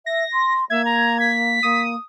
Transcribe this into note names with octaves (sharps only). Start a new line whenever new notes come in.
E5 A#6
C6
A#3 E5 G#6
A#5
B6
A#3 D#6